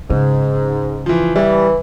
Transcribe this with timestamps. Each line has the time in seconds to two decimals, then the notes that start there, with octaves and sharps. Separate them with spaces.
0.10 G#2 C#3
1.06 E3 F3
1.36 E3 G3